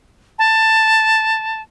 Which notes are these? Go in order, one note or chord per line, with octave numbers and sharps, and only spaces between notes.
A5